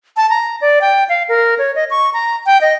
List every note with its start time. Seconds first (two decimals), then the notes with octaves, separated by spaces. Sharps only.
0.17 A5
0.30 A#5
0.61 D5
0.81 G5
1.09 F5
1.29 A#4
1.58 C#5
1.75 D#5
1.90 C#6
2.14 A#5
2.46 G5
2.61 D#5